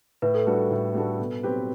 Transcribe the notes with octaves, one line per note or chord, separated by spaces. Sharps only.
A2 B4
A4
G3 D4 F#4 A4 B4
A2
G3 D4 F#4 A4
B2
F#3 C4 G4 B4